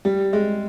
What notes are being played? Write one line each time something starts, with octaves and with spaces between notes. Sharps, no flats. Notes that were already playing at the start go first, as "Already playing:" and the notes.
G3
G#3